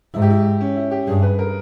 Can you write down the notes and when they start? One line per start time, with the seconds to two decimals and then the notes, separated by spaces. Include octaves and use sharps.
0.14 G#2 E4
0.22 G4
0.31 E4
0.61 C#4
0.76 E4
0.91 G4
1.07 G2 G#4
1.23 B4
1.39 A#4